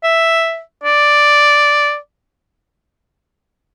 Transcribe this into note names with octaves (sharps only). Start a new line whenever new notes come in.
E5
D5